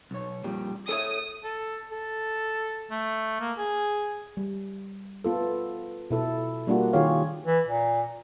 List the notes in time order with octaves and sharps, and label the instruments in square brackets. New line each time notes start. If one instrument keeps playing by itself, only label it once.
[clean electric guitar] B1 C#5
F2 A#2 G3
[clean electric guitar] A4 C#5 E5 [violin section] D#6
[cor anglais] A4
A4
A3
A#3
G#4
[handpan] G3
B3 F4 A4
B2 E4 A4
G3 A#3 D4 F4 F#4
D#3 F4 G4 G#4 C#5 F5
[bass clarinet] E3
A#2